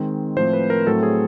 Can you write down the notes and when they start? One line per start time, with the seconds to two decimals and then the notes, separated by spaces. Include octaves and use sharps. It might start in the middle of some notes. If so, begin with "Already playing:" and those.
Already playing: D#3 G#3 C4
0.36 A2 F3 A3 C4 C5
0.53 B4
0.70 A#4
0.86 A2 F#3 A3 C4 A4
1.03 G#4